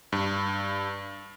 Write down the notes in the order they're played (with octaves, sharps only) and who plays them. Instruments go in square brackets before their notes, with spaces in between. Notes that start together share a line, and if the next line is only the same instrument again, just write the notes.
[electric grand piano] G2